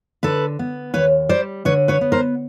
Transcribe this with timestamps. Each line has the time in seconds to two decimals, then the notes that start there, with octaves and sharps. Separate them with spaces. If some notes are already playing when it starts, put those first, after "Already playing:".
0.23 D3 A4 B4
0.59 B3
0.94 D#2 B4 C#5
1.29 G3 C5 D5
1.65 D3 B4 C#5
1.88 B4 C#5
2.01 B3
2.12 A#4 C5